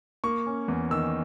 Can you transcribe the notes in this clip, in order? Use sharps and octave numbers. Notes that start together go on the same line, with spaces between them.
A#3 C#6
C#4
E2
D#3 E6